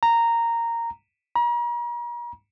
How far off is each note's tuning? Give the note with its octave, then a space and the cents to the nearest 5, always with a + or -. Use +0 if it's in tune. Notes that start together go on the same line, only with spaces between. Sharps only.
A#5 -10
A#5 +40